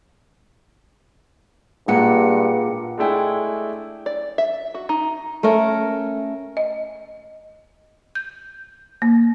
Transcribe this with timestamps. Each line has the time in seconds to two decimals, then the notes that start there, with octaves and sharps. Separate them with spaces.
1.88 G2 A#2 G#3 A#3 F#5 C#7
2.98 G#3 A3 D4 E4 G5 G#5
4.06 D5
4.38 E5
4.74 F#4
4.89 D#4
5.43 A3 C#4 A#4
6.57 D#5
8.15 G6
9.02 A#3